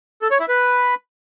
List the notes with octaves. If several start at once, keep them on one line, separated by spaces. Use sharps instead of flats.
A4
C#5
E4
B4